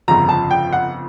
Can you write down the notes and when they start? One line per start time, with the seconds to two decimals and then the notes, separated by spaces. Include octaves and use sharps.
0.08 G1 F2 C#3 F3 A#5
0.29 A5
0.51 G5
0.73 F#5